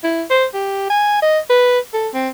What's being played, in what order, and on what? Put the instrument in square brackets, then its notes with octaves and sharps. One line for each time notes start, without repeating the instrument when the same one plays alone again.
[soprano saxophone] E4
C5
G4
G#5
D#5
B4
A4
C4